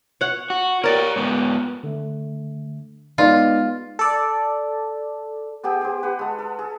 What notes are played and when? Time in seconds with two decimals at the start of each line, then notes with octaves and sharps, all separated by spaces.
0.21 C#5 F#5
0.50 F#4
0.84 G4 A#4 C#5 D5
1.16 G#2 B3
1.83 D3 A3
3.18 G#3 B3 D#4 F4 B4 D5
3.99 A4 D5
5.63 B3 G4 G#4 G5
5.81 G4 C5
6.03 B4 F#5
6.19 G#3 A4
6.39 A4
6.59 G#4